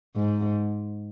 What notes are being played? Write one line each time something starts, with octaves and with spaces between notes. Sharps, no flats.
G#2